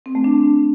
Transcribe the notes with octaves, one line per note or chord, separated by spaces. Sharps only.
C4
A3
D4